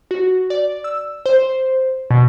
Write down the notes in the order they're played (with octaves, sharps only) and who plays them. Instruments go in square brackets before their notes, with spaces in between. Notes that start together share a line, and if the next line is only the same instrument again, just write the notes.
[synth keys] F#4
D5
E6
C5
B2